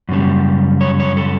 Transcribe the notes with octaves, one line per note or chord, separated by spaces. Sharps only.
F#2 C#3 G3
C#5
C#5
A4